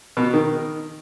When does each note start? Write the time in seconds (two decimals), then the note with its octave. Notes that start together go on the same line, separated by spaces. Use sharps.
0.17 B2
0.33 D#3